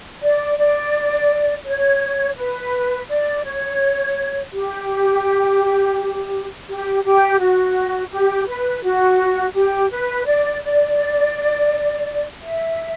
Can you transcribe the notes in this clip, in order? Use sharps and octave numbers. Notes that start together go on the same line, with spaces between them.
D5
D5
C#5
B4
D5
C#5
G4
G4
G4
F#4
G4
B4
F#4
G4
B4
D5
D5
E5